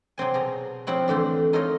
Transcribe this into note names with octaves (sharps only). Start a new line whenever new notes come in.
C3 F#3 C4 G#5
B2 G#4 A#5
F3 F#3 C4 E4 F#4
D3 E3 A3 C5
D#4 F4 A4 A#4 C#5 D#5